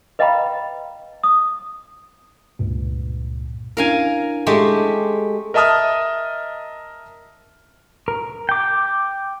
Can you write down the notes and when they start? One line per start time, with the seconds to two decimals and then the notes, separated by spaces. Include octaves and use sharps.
0.19 B4 D#5 F5 G5 A#5 B5
1.24 D#6
2.59 C#2 G2 A#2
3.77 C#4 D4 E4 A#4 F5 G#5
4.47 G#3 A3 G4
5.54 A#4 D#5 E5 A5 D#6 F6
8.08 A#4
8.49 G5 D6